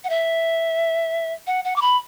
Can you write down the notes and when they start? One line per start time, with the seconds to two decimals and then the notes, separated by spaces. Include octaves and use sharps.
0.04 F#5
0.10 E5
1.47 F#5
1.65 F#5
1.76 D6
1.82 B5